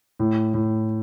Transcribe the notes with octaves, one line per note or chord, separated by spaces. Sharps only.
A2
A2